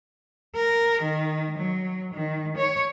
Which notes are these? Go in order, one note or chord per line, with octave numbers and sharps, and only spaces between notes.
A#4
D#3
F#3
D#3
C#5